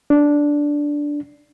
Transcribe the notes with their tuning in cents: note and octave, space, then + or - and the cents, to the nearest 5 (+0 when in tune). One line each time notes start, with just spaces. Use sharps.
D4 -5